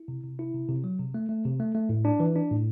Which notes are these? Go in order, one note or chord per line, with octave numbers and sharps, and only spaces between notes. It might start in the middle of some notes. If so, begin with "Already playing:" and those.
Already playing: E4
C3
C3
E4
C3
C3
F#3
C3
A3
A3
C3
A3
A3
A2
D4
E3
D4
A2